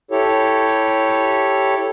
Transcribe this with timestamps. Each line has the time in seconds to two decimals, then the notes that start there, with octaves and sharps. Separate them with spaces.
0.11 E4 G4 A4 C#5